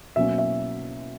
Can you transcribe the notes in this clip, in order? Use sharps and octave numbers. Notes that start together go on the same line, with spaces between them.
B2 F#3 A#3 C#4 E5
E5